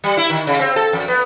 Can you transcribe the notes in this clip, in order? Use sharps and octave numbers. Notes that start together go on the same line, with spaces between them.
G3
E4
D#3
C#3
C4
A4
F2
B3